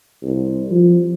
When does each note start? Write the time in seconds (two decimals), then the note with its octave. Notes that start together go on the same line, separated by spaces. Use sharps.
0.23 C2
0.71 F3